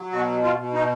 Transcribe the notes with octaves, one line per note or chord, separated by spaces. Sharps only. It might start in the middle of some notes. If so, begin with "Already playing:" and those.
Already playing: F#3
B2 F#4
F4
B2
D#4